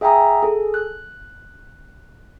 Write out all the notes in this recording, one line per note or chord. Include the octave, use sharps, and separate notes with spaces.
G#4 E5 G5 G#5 A#5 D#6
G#4 A4
F#6